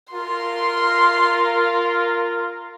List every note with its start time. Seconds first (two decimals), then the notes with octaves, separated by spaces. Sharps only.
0.12 F4 A#4 C6